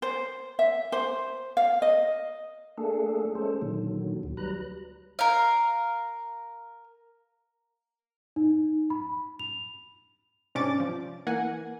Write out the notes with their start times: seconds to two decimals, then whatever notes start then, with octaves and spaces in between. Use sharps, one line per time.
0.02 C5
0.59 E5
0.92 C5
1.57 F5
1.82 D#5
2.78 A3 A#3 D4 G#4 A4
3.35 G#3 A3 C#4 A4 C5
3.62 A#2 D3 D#3 F#3
4.23 D2
4.37 F#3 G3 B4 A#5 F#6
5.19 A#4 F5
8.36 D#4
8.90 B5
9.39 F7
10.55 G#2 C3 C#4 D4 D6 A6
10.80 F3
11.27 E3 A#3 F#5 G#5